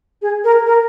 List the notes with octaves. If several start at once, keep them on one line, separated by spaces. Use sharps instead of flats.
G#4
A#4
A#4